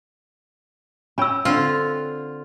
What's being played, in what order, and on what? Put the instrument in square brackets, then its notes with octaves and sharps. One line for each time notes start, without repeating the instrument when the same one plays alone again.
[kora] C#4 G5 [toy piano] B5 E6
[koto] D3 F4 [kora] C4